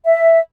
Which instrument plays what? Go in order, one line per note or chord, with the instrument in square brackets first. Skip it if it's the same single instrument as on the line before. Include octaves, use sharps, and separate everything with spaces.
[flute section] E5